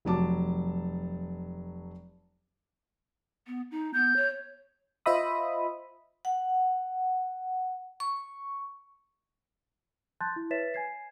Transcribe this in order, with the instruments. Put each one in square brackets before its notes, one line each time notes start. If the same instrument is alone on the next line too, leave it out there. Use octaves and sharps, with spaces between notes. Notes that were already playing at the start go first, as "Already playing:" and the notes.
[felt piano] F1 F#3 A5 D6
[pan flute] B3
D#4
[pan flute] B3 [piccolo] G6
[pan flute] C#5
[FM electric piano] F4 C5 D#5 E5 B5 D#6
[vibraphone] F#5
C#6
[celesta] A5 C6 F#6 G6 A6
E4
B4 C#5 E5 A6 B6 E7
G#5 G#6 C7